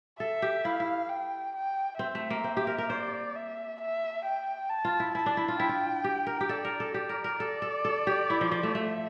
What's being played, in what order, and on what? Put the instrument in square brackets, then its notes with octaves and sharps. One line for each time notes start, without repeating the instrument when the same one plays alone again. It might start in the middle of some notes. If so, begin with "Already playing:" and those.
[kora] A4 [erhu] E5
[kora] G4
[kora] E4 [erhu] F5
[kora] E4
[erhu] G5
G5
[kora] C4 [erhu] E5
[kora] A3
A#3
C4
G4
A#4
A#4
[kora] C5 [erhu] D5
[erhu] E5
E5
G5
A5
[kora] F4
E4
[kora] E4 [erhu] A5
[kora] D4
E4
F4
[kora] E4 [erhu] G5
[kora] F4
G4
A#4
G4
[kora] A4 [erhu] D5
[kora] A#4
A4
G4
A#4
A#4
[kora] A4 [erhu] D5
[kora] A4
A4
G4
E4
F3
F3
A3
[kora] A3 [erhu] E5